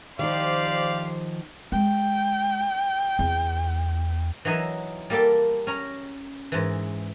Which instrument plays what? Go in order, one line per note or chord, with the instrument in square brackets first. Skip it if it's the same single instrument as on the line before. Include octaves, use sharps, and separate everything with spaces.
[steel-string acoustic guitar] D#3 F3 [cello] G4 C5 [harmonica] D5 F5
[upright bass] G#3 [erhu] G5
[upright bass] E2
[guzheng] E3 F#3 D#4 D#5 E5
G3 A#3 G4 A4 G5
C#4 A#5
G#2 E3